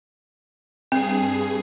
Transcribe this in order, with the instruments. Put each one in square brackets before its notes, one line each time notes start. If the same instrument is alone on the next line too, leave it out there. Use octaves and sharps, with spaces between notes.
[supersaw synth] G2 G#4 C7 [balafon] C4